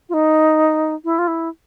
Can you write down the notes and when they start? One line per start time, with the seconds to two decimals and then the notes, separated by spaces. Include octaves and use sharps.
0.09 F4
0.14 D#4
1.05 E4
1.19 F4
1.28 E4